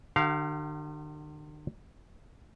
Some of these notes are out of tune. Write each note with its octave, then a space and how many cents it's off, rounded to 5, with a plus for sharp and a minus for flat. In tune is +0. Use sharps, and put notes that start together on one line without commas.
D3 +45 G4 -45 F5 +0